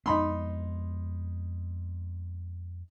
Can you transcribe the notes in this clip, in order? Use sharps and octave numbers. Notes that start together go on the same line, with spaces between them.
F2 G#3 B3 D#4 B5 C6